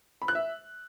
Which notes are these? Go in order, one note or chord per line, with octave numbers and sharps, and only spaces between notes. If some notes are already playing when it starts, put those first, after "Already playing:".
B5
F#6
E5